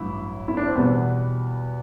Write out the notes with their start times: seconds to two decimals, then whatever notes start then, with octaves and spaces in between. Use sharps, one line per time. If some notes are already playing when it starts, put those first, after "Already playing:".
Already playing: A1 G2 F#3 E4
0.48 E4
0.57 D4
0.67 C4
0.75 E2 B2 G3 B3